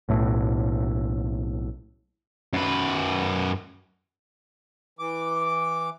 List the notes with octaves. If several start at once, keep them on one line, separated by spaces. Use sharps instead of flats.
B1 A2 A3
F#2 B4
E3 D6